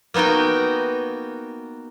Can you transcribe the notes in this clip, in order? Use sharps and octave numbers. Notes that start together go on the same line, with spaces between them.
A#3 B3 D#4 F#4 G5